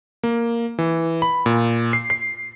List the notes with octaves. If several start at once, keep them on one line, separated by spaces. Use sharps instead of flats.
A#3
E3
B5
A#2
C7
C7